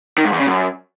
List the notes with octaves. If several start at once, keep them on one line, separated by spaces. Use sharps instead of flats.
D#3
G#2
E2
C#3
F#2